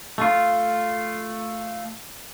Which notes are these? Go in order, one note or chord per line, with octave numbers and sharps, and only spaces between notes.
A3 F4